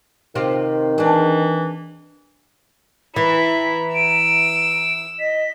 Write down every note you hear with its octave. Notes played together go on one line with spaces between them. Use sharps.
C3 D#3 C4 F4
E3 D4 G#4
E3 E4 A#5 B6
E6 D7
D#5 B6